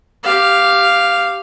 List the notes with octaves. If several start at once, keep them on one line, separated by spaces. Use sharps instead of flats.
G4 F5